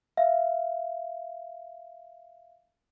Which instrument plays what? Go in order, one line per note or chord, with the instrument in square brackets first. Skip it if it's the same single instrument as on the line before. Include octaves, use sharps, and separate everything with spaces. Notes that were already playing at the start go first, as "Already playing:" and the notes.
[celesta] E5 F5